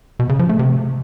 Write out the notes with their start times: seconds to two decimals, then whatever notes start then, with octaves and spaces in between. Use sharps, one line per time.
0.19 B2
0.29 C#3
0.39 F3
0.49 A3
0.59 C3